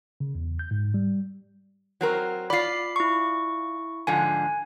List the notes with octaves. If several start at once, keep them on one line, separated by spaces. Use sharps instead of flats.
C#3
E2
G6
G#2
G3
F#3 C4 A#4
F4 D5 B5 C7
E4 C#6
G#2 D3 F3 G#5